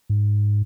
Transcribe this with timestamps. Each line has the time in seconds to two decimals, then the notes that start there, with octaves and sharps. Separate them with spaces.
0.10 G#2